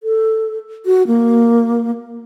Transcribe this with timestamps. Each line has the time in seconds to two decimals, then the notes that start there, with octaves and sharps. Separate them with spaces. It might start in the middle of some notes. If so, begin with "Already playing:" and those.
0.03 A4
0.86 F#4
1.07 A#3